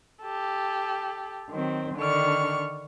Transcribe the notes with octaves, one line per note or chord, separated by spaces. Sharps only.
G4 A4
D#3 F#3 C4
D3 D#3 D4 C#6 F6